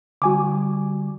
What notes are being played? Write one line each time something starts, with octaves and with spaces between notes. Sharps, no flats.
D3 G3 F#4 G#5 D6